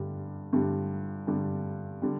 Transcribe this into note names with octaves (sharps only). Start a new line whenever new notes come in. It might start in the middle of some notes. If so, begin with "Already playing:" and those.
Already playing: G2 D3 G3
G2 D3 G3
G2 D3 G3
D3 G3